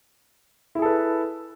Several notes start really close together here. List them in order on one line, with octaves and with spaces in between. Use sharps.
E4 G#4 A4 B4